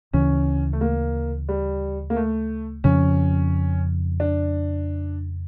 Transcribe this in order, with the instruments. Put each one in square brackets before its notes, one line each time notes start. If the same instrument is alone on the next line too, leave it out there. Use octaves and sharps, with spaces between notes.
[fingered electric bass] D2 C#3 E3 [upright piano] C#4
[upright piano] A3
A#3
G3
A#3
A3
[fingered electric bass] F2 C#3 F3 [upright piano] C#4
[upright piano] D4